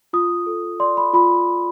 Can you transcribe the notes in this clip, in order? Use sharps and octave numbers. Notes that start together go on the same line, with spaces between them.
F4 D#6
A4
D5 C6
B5
F4 B5